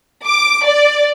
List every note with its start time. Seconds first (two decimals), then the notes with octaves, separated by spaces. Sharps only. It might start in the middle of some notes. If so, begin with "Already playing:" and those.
0.25 D6
0.65 D5